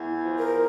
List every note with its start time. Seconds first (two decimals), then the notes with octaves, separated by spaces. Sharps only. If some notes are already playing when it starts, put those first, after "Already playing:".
Already playing: E2
0.24 F3
0.39 A#4